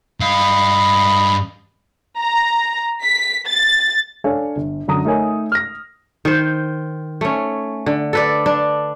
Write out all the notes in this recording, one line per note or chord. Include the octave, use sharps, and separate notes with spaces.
G2 D#5 F5 B5
A#5
B6
A6
D4 A4 C#5 F5 G#5
G1
F#2 D3 A#5 D#6
A3 D#4 A#4 C#5 G#5
F6 A#6
D#3 C5
A3 C#4
D3
A4 B4 D5
D4